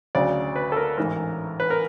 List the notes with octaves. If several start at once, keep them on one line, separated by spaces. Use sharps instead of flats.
D2 C#3 F#3 D5
B4
A4
A#4
A1 G#2 E3 A#4
B4
A#4